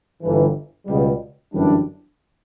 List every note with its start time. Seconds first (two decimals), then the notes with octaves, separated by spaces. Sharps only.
0.21 G1 G2 E3
0.86 C#2 B2 G3
1.51 G1 F#2 E3 G3 D4